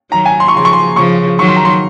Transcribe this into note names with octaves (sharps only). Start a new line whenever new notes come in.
D#3 F#3 A#5
G#5
C6
C#6
C#3 F3 C6
C#6
C6
C#3 F3 C#6
D#3 F#3 C#6
C6
A#5
C6